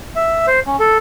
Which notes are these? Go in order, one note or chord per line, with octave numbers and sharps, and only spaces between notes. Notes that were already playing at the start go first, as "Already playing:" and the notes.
E5
C5
C#4
A4